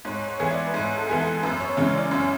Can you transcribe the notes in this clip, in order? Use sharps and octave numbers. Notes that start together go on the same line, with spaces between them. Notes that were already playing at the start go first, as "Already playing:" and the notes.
G#2 C#5
C#5
E3 B3 E4 G#4
D5
B4
G#2 C#5
A4
E3 B3 E4 G#4
A4
F#2 B4
C#5
C#3 E3 G#3 C#5
D5
F#2 C#5